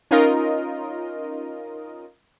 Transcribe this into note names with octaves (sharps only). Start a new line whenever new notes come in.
C#4 D#4 F4 A#4 D#5